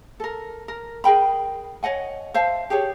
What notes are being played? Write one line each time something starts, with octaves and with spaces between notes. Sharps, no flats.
A4 A#4
A#4
G#4 A#4 G5 B5
C#5 D#5 F#5 G#5
C5 E5 F5 A5
G4 G#4 B4 C#5